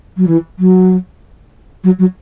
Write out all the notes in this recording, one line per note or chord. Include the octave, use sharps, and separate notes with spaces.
F#3
E3
F#3
F#3
F#3